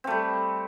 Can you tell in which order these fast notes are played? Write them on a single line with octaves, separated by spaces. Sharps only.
C4 A3 G3